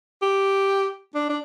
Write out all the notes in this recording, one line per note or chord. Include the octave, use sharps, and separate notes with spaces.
G4
D4
D4